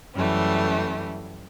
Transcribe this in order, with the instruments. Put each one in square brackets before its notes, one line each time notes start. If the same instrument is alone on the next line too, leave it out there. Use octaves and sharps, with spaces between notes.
[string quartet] F#2 E3 G3 A3